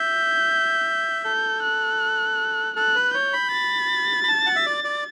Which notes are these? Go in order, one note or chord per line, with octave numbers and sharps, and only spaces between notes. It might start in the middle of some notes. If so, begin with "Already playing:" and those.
Already playing: E5 G6
A4 G6
F#6
A4 F#6
B4
C#5 G6
B5
A6
B5
A5
F#5
E5
D5
D5